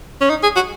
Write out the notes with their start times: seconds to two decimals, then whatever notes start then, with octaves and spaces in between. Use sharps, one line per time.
0.21 C#4
0.30 D#4
0.43 G#4
0.56 F#4